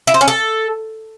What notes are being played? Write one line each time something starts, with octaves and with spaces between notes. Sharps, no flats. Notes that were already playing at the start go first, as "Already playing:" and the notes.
E4
C5
C#4
A4